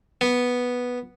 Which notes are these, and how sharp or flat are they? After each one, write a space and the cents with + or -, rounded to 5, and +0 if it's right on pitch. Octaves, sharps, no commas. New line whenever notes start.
B3 -5